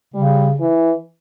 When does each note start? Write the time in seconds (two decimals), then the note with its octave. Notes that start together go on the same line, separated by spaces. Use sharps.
0.14 C#3 G3
0.61 E3